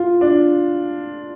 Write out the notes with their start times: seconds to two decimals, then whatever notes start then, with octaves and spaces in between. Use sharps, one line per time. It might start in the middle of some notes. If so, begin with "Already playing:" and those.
Already playing: F4
0.21 D4